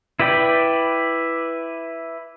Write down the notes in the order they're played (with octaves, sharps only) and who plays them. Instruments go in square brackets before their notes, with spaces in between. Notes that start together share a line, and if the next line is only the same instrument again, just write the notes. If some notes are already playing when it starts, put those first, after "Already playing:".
[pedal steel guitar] E4 B4 D5 G5